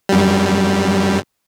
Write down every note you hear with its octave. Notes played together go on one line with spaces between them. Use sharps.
F#2 G3